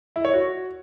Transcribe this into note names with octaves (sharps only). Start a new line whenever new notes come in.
E4
C#5
F#4